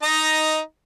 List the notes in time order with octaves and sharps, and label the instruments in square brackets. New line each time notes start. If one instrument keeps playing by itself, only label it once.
[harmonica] D#4 D#5 A#5